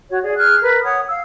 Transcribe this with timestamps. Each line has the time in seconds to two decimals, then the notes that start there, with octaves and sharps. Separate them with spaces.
0.10 F#4 C#5
0.22 G#4 D5
0.37 G#4 F6 F#6
0.61 A#4 B4
0.82 C#5 F#5 D#6
1.07 F5 E6